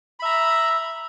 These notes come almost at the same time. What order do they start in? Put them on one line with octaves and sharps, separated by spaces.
B5 E5 A#5